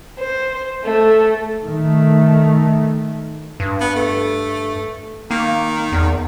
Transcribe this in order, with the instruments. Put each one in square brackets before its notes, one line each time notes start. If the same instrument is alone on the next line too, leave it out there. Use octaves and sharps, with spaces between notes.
[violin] C5
A3
[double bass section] D#3 A3
[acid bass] G2
[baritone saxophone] B3
A3
[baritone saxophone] D#3 [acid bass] A#3
[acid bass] E2